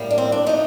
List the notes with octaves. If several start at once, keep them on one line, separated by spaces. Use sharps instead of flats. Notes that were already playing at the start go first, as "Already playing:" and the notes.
Already playing: A2 G3 A#3
D4
C4
D4
F3 A3 D#4